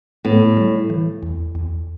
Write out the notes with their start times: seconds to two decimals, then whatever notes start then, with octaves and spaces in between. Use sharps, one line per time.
0.25 A2 B3
0.57 G3
0.90 E3
1.23 E2
1.55 E2